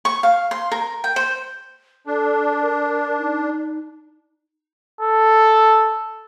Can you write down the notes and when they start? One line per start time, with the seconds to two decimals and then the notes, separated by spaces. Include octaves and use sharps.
0.05 C#6
0.23 F5
0.51 C6
0.72 A#4
1.04 G5
1.16 C5
2.07 D4 A4
2.61 A#4
3.17 D#4
5.01 A4